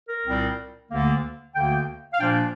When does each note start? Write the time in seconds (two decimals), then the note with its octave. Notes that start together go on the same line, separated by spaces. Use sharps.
0.08 A#4
0.25 C2 A#2 G3 C4
0.90 D2 D3 A#3
1.55 D2 D3 A#3 G5
2.13 F5
2.20 A#2 F3 A#3 D4 G5